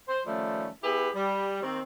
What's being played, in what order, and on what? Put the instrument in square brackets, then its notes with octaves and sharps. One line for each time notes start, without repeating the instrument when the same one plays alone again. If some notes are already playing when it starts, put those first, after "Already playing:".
[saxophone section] C5
D#3 F3 G3 A3 C#4
B3 E4 G4 G#4 B4
G3
D#3 A#3 C4